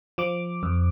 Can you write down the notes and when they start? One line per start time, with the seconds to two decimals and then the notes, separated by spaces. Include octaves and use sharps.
0.18 F3 D6
0.63 F2